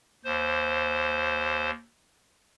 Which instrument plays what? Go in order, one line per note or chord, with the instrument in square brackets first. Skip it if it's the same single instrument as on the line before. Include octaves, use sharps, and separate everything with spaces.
[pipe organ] D#2 C5